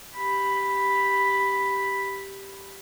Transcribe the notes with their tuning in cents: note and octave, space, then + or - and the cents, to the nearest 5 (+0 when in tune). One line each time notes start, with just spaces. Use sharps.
G4 +0 B5 +0